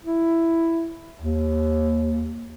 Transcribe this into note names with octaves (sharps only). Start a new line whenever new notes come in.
E4
D#2